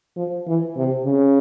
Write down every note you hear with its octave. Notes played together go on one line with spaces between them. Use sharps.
F3
E3
C3
C#3